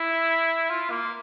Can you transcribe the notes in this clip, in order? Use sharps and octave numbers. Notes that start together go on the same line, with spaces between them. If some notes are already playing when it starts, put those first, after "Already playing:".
Already playing: E4
F4
A#3